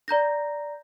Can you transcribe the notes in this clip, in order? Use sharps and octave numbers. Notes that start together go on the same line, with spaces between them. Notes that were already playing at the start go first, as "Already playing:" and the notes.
D5 A#5 G6 A#6